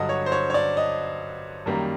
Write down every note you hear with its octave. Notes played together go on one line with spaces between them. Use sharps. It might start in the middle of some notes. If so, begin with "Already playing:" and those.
Already playing: G2 D3 F#3 D#5
C#5
C5
C#5
C#5
D5
D#5
F#2 D#3 G3 A#3